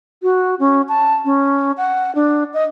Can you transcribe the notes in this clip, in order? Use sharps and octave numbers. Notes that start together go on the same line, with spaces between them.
F#4
C#4
A5
C#4
F#5
D4
D#5